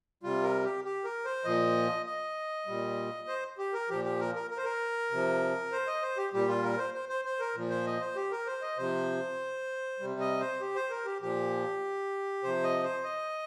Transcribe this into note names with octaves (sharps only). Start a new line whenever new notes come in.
C3 G3 F4
A#4
G4
G4
A#4
C5
A#2 F3 D#5
D#5
A#2 G3
C5
G4
A#4
A#2 F3 G4
G4
A#4
A#4
A#4
C5
A#4
C3 F3
C5
D#5
C5
G4
A#2 G3 G4
F4
A#4
C5
C5
C5
C5
A#4
A#2 F3
C5
D#5
C5
G4
A#4
C5
D#5
C3 F3 C5
C3 G3
D#5
C5
G4
C5
A#4
G4
A#2 F3 G4
C3 F3 C5
D#5
C5
D#5